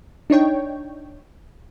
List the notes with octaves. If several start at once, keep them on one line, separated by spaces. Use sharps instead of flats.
D4 D#4 C#5 G5